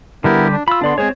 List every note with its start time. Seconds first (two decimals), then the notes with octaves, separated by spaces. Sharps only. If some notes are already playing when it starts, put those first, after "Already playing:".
0.24 D3 G3 B3 E4 G4 A#4
0.52 D4
0.68 F4 B5 E6
0.82 D3 B3 D4 D5 C6
0.98 G#3 C4 G#4 C5 C#5